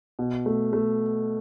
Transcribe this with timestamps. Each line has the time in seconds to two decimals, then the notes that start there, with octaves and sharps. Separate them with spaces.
0.19 B2
0.46 A3
0.73 A3